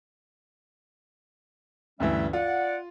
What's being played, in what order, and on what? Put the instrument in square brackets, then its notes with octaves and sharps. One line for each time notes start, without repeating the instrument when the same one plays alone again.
[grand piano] D2 G2 E3 [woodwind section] G3 C#4 E5
[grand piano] F4 [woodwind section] D5 F#5